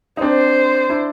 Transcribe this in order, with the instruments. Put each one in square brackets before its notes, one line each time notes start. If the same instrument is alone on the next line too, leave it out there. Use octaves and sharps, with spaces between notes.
[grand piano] D#4
[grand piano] C4 D4 [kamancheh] C5
[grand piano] D4 E4